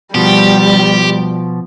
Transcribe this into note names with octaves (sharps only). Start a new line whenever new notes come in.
B2 F3 G3 G4